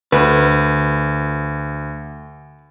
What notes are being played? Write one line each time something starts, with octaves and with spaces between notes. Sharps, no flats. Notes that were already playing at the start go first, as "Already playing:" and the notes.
D2 B4